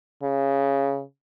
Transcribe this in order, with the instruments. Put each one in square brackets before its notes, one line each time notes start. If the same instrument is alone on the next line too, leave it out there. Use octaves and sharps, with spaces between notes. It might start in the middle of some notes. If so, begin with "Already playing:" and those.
[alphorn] C#3